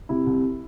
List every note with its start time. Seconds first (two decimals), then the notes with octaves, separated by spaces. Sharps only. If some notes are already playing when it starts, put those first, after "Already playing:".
0.09 C3 E4
0.27 C2